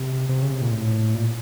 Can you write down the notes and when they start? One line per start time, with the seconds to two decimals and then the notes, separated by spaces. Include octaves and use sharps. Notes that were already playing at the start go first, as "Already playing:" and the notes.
Already playing: C3
0.29 C3
0.42 C#3
0.51 C3
0.61 A#2
0.71 A2
1.14 A#2